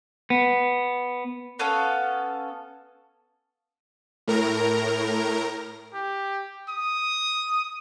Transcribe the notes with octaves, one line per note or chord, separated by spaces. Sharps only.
B3
B3 C#4 A4 F5
A2 A#4 A#5
G4
D#6